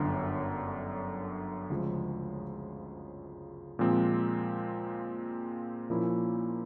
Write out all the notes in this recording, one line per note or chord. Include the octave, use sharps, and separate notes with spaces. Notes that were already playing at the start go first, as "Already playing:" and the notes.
Already playing: G1 F#2 D3
D2 C#3 F3 G#3
A#2 F3 G#3 C4
A#2 F3 A#3 C#4 E4